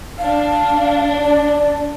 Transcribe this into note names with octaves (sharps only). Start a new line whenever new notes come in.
D4 F5
D5